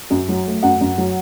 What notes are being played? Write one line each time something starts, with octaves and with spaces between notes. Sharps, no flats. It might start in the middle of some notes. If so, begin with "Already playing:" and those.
F#2
F#3
A3
F#2 F#5
F#2
F#3